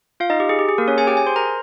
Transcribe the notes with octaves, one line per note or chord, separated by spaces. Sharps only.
F4 F5
D#4 D#5
G4
G#4
G4
G#4
A#3 A#4
C#4 C#5
G#4 G#5
G4 G5
G#4 G#5
C5 C6
A#4 A#5